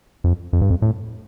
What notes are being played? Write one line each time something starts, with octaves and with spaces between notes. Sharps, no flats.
F2
F2
G2
F2
A2